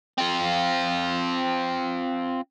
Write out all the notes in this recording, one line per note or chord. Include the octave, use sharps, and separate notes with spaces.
C4 F4